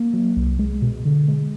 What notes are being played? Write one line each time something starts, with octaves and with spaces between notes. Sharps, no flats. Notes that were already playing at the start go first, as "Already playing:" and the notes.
Already playing: A#3
F#3
C2
G#3
B2
D3
G#3